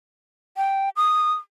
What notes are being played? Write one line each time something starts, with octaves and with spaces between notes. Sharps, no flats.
G5
D#6